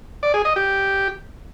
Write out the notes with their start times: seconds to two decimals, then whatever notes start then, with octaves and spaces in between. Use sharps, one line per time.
0.23 D5
0.34 G#4
0.45 D#5
0.56 G4